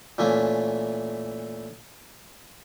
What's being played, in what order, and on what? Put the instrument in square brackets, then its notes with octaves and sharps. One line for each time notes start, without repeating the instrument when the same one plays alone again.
[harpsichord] A#2 E3 A3 A#3 C#4